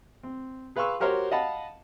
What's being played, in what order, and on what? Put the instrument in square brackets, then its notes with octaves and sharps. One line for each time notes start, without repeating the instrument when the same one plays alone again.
[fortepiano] C4
G#4 B4 F5 C6 C#6 E6
F#4 G4 A#4 C5 C#5
D#5 F5 F#5 A5 B5